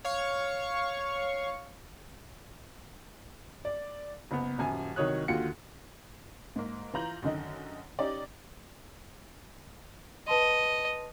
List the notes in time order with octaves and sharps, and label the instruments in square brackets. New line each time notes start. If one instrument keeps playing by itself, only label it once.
[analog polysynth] C#5 F5 C#6
[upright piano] D5
F#1 B3
D#1 F#2 G#5
C2 D#3 F#3 C#5 D#6 F#6
D#2 D3 F4 F#4 C#7
[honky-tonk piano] G#2 A#3
E3 F4 A#5 G6 F#7
F#2 D3 D#3 D#4
C#4 D#4 G4 D5
[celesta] B4 A5 C6 [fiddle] D#5